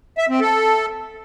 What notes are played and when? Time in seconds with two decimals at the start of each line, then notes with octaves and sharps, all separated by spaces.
0.18 E5
0.29 C4
0.41 A4